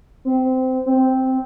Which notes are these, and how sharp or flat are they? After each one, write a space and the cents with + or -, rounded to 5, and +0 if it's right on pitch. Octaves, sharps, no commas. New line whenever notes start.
C4 -20
C4 -5